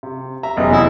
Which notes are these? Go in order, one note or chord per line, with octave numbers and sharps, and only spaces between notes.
C3
E5 A#5
F1 F#2 C#3 E3 B3 D#5
E4 F#5